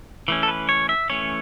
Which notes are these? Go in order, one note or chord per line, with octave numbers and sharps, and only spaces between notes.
E3 A3 C#4
A4
B4
C#5
E5
E3 A3 C#4 C#5